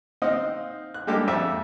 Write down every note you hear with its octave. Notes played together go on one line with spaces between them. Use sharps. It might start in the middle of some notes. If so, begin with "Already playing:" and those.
C4 D#4 D#5 F5 F#5
F#6
G3 G#3 A#3 D4 G4 A4
F2 E5